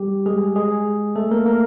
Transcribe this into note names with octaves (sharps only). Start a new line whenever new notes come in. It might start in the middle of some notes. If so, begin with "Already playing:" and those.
Already playing: G3 G4
G#3 G#4
G#3 G#4
A3 A4
A#3 A#4
A#3 A#4